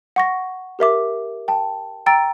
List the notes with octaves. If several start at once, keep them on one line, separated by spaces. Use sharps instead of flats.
F#5 C#6 A#6
G4 A#4 E5 D6
G5 A5
G5 A#5 E6 A6 D7